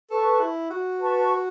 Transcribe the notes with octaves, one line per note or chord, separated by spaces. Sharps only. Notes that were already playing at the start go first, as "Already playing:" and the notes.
A4 B4 A5 C#6
E4
F#4
B4 A5 C#6